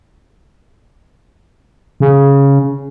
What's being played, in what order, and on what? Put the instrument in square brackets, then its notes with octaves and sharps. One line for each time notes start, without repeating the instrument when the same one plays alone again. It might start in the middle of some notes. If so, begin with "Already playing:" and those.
[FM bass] C#3